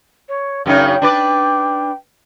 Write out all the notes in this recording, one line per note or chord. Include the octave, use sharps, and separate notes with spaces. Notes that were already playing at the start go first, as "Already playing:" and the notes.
C#5
F#2 C#3 D#4 G5
D4 B4 D5